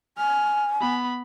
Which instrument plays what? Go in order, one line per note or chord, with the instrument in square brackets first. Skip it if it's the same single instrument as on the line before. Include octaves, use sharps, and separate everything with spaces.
[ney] G#5 [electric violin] F6
[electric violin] B3 B5